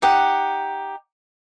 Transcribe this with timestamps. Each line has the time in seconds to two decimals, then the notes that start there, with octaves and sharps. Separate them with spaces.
0.02 D#4 G4 F#5